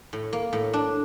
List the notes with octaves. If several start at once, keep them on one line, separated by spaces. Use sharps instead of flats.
A2
A#3
A2
D4